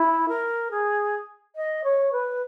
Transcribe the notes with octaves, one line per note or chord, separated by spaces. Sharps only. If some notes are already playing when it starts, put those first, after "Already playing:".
Already playing: E4
A#4
G#4
D#5
C#5
B4